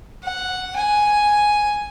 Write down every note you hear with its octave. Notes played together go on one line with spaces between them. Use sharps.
F#5
G#5